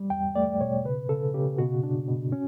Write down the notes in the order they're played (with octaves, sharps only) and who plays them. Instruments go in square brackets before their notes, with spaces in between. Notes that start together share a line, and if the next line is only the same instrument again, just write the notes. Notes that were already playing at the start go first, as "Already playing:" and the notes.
Already playing: [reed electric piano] G3
E2 G5
A3 D5
B2 C#5
C#3 B4
C#3 A4
C#3 G4
B2 F#4
D4
B2
C#4